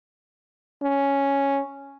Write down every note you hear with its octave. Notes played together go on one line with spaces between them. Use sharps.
C#4